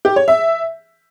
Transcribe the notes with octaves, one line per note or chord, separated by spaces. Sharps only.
G4
C#5
E5